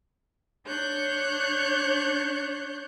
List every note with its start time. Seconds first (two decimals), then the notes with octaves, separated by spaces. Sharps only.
0.66 D4 C#5 F#6 G6